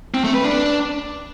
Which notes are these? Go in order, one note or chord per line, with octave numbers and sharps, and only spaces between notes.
C4
A3
B4
D4